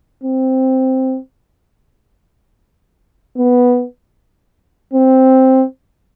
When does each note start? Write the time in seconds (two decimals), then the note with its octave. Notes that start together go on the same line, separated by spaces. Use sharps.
0.24 C4
3.38 B3
4.94 C4